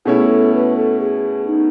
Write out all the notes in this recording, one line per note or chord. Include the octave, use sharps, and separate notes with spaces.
B2 A3 C#4 E4 G#4
A4
B4
A4
G#4
D#4